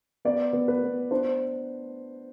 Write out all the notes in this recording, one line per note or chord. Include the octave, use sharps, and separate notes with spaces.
B3 D5
B3
B4
B3
D4 C5